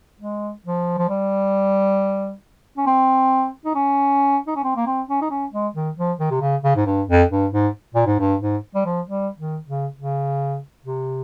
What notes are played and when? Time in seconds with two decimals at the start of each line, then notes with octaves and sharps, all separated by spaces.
0.20 G#3
0.64 F3
0.98 F3
1.09 G3
2.77 C#4
2.86 C4
3.65 D#4
3.75 C#4
4.47 D#4
4.56 C#4
4.64 C4
4.77 A#3
4.86 C4
5.08 C#4
5.21 D#4
5.30 C#4
5.52 G#3
5.75 D#3
5.97 F3
6.19 D#3
6.31 C3
6.41 C#3
6.64 C#3
6.76 G#2
6.86 G2
7.08 F2
7.31 G2
7.53 G#2
7.94 A#2
8.06 G#2
8.19 G2
8.42 G#2
8.75 G3
8.86 F3
9.07 G3
9.38 D#3
9.67 C#3
9.97 C#3
10.84 C3